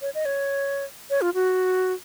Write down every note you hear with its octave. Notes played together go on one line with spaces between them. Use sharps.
C#5
D#5
C#5
C#5
F4
F#4